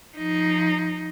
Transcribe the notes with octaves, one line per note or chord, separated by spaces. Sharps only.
F3 D#4